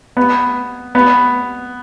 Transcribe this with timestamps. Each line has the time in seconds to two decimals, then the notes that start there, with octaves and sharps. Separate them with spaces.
0.17 B3
0.95 B3